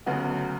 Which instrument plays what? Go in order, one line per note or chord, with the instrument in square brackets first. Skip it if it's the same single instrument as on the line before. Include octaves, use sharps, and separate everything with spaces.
[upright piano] D2 C#3 F#3 B3